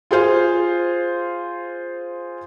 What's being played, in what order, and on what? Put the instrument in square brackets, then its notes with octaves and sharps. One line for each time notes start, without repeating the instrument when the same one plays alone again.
[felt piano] F4 G#4 C5 F5